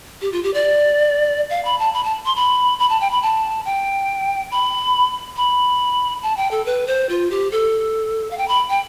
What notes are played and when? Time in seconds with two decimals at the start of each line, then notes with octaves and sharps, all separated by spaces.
0.22 G4
0.32 F4
0.44 G4
0.54 D5
1.50 F5
1.65 B5
1.79 A5
1.93 B5
2.04 A5
2.26 C6
2.36 B5
2.79 B5
2.90 A5
3.01 G5
3.11 B5
3.22 A5
3.65 G5
4.51 B5
5.37 B5
6.23 A5
6.37 G5
6.51 A4
6.66 B4
6.87 C5
7.09 F4
7.31 G4
7.52 A4
8.31 F5
8.38 G5
8.48 B5
8.70 G5